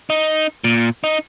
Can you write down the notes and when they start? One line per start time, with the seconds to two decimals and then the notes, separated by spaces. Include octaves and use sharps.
0.10 D#4
0.64 A#2
1.04 D#4